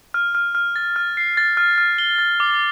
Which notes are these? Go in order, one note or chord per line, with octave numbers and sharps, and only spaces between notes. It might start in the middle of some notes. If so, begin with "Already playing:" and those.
F6
F6
F6
A6
F6
C7
A6
F6
F6
G7
A6
D6